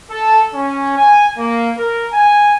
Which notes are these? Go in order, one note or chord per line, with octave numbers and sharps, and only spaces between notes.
A4
C#4
G#5
A#3
A#4
G#5